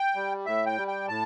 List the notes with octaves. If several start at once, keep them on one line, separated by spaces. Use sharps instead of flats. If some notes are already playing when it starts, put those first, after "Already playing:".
Already playing: G5
G3
A2 E5
G5
G3
G5
A2 A5